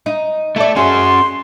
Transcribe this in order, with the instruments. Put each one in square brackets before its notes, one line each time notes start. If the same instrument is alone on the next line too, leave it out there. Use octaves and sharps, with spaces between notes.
[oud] D#4
[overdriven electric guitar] A3 A4 [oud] E4 D5
[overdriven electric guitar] C#4 F#4 [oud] G#4 [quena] C6